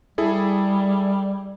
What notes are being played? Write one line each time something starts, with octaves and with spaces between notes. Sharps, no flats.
G3 E4 G#4 A4